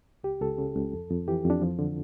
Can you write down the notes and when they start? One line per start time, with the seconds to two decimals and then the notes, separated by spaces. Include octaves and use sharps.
0.24 C#2 G4
0.41 C#2 A4
0.58 C#3
0.76 C#2
0.93 F2
1.10 F2
1.28 E3 G4
1.45 F2
1.50 D4
1.62 F3
1.79 D3